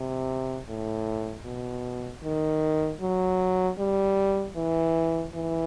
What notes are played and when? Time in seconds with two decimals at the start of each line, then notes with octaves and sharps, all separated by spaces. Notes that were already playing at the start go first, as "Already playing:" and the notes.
Already playing: C3
0.68 A2
1.45 B2
2.23 D#3
3.01 F#3
3.79 G3
4.56 E3
5.34 E3